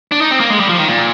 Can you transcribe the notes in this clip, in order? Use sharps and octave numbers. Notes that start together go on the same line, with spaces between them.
D4
D#4
C4
A#3
G#3
G3
F3
D#3
A#2